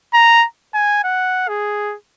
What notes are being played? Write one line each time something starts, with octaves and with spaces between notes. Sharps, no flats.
A#5
G#5
F#5
G#4